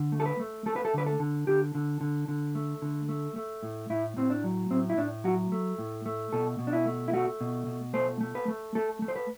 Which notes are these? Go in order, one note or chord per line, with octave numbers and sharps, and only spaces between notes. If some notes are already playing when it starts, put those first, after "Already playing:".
Already playing: D3
A3
A4
B4
A3
A3 A4
B4
A4
D3 B4
A4
D3
D3 G4
D3
D3
D3
A3
D3
A3
A3
A2
A2 E4
A2 C4
D4
F#3
A2 C4
E4
A2 D4
F#3 F#4
A3
A2
A3
B2 A4
B2
D4
E4
A3
E4
A3 F#4
B2
B2
A3 C5
A3
B4
A3
A3 A4
A3
C5
B4